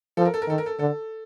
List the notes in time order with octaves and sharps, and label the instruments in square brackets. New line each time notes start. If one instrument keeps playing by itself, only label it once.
[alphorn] F3 [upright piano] A4
[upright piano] A#4
A4
A#4
[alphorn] D#3 [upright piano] A4
[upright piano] A#4
A4
[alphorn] D3 [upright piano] A4